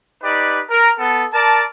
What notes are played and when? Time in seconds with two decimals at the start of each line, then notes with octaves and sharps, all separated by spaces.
0.22 D#4 G4 B4 D5
0.70 A#4
0.98 B3 A4
1.33 A#4 D5 A5